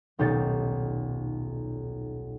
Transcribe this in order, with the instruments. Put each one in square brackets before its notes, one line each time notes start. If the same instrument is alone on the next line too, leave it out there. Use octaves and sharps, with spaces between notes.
[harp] D#1 B1 D#4 G4 A6 C#7